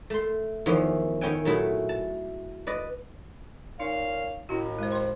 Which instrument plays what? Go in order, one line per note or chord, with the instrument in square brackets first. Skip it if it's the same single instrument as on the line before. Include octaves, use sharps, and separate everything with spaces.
[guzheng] A3 C6
E2 D#3 F3 C#4 E4
D#3 C#4 E4 G5 G#5
A#2 F#3 A3 E4 G#4 A4
A5
B4 D5 D#5
[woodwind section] A#2 C#4 F5 [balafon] D#4
[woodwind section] D#2 A2 [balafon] C#4 E4 F#4
[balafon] G#3 C5
C5 C6